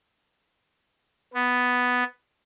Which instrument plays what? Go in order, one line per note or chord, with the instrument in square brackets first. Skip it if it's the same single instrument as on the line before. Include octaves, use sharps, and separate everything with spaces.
[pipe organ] B3